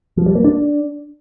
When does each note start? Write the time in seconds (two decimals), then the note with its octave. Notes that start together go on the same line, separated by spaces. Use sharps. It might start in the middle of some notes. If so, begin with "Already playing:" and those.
0.17 F3
0.26 G3
0.35 A#3
0.44 D4